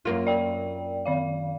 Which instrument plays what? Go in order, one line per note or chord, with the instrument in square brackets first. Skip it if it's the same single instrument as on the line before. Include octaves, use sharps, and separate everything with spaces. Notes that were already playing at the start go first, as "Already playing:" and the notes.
[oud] F#2 A#3 F4
[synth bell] D5 G5
D#3 D5 F5